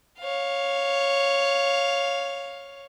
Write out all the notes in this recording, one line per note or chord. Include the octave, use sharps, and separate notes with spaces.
C#5 F5